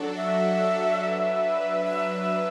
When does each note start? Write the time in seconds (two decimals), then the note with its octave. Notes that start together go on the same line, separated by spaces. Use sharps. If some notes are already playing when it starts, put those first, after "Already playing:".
Already playing: F#3 D4 F#4 A4
0.17 E5
1.00 F#3 D4 B4
1.85 E5